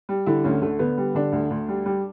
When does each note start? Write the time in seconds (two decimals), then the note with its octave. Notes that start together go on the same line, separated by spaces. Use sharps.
0.09 G3
0.26 D3 E4
0.44 D2 C#4
0.62 D3 A3
0.79 D3 B3
0.98 G3
1.15 D3 D4
1.32 D2
1.50 D2
1.68 G3
1.86 G3